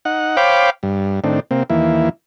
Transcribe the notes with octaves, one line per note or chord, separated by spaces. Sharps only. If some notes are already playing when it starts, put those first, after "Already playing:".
D#4 F#5
C5 C#5 F5 G5 B5 D6
G2
A2 D#3 C4 D4
C3 A#3 C4
D#2 E3 A#3 E4